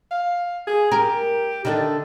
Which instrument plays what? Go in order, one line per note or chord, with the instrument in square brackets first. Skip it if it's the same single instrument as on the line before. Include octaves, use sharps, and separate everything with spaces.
[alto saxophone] F5
G#4
[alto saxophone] G4 [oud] A#4
[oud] D3 D4 A4 [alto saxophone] D#3